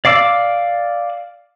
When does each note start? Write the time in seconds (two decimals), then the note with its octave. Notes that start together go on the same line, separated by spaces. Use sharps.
0.05 D5 F5 D6 E6